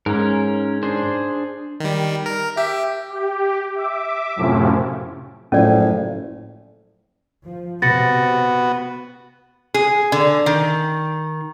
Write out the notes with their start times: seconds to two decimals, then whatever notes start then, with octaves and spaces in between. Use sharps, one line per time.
0.06 G#2 C#4 A#4
0.83 D4 G#4 C5
1.80 D#3 G3
2.26 A#4
2.57 G4 E5
3.09 G4
3.75 E5 D6
4.36 F#2 A2 C3 F3 C#4
5.52 F#1 A2 F3 C#4 D5
7.45 F3
7.82 C3 B3 F#4 A6 A#6 C#7
9.74 G#4
10.12 D3
10.46 D#3